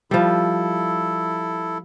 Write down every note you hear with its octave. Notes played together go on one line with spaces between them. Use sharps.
F3 G3 E4 A4